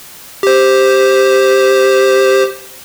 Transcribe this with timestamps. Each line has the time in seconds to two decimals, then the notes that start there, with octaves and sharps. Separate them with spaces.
0.43 G4 C5